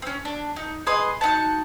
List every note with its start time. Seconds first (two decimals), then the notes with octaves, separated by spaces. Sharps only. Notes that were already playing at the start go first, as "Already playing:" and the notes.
0.02 C4 C#4
0.25 D4
0.56 D#4
0.86 G#4 B4 D#5 C6
1.21 D#4 E4 F#4 A5